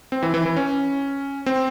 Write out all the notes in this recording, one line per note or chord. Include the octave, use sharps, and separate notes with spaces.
C4
E3
E3
E3
C#4
C4